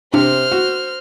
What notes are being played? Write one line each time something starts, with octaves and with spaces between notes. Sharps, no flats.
C3 D4 C5 F6
F#4